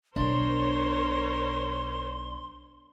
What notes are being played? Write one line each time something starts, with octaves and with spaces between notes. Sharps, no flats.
B1 B2 D4 A#4 C5 C#5 C6